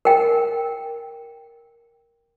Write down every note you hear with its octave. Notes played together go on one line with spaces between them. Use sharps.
A#4 G5